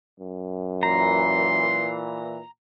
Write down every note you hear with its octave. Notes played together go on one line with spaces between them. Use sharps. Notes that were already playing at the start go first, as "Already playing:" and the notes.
F#2
A#2 E3 A#5 C6